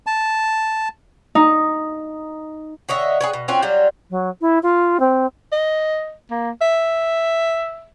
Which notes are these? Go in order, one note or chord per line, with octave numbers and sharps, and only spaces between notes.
A5
D#4
D3 C#5 D#5 E5
G#4 B4 C#5
B2
C4 C#4 F4 F#4
F#3 G3 F4
F#3
E4
F4
C4
D#5
A#3
E5